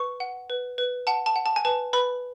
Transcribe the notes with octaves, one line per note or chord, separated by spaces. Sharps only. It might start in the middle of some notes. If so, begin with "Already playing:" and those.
Already playing: B4 C#6
F#5
B4
B4
F#5 A5
A5
F#5
A5
G#5
B4 A5
B4 B5